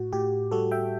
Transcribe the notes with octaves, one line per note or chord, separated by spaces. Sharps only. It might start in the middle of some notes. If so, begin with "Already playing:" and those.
Already playing: A2 F#4
A2 G4
G3 F#4 A4
E5 G5